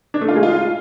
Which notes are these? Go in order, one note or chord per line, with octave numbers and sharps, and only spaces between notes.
D4
A3
F4
G#3
F4